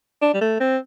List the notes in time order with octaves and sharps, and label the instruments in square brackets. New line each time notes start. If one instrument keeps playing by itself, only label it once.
[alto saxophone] D4
G3
A3
C4